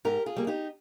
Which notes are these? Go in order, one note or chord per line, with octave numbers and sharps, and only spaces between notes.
G#2 G4 A#4
F4 G#4
G3 A#3
D#4 G4